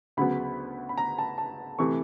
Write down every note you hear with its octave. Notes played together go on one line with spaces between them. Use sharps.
D2 C#3 F#3 B3 B5
B5
A#5
A5
A5
C3 E3 A3 C#6